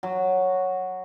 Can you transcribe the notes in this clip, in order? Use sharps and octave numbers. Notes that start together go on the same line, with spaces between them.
F#3